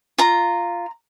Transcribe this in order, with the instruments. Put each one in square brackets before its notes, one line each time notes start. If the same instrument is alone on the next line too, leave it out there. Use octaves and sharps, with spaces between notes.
[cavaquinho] F4 A#5